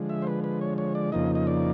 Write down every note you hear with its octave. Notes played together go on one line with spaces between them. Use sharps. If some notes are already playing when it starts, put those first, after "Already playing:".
Already playing: D3 F3 G#3
E5
C5
B4
B4
C#5
C#5
D5
F2 C#3 F3 A#3 D#4 D#5
D#5
D5